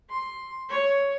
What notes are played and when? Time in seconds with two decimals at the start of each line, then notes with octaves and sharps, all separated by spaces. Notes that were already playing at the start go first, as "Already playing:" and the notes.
0.10 C6
0.70 C#5